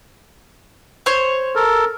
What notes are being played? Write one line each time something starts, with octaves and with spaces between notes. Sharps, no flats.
C5 C#5
A4 A#4